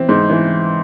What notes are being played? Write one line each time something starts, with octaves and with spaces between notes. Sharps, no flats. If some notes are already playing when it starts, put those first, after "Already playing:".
Already playing: E3 C4
G#2
E3